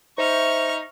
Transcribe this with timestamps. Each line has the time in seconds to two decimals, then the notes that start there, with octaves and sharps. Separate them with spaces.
0.18 D#4 C5 E5 C#6 F6